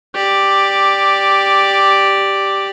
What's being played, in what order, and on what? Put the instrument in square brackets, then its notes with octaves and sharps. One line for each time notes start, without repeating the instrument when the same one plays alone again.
[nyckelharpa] G4 D5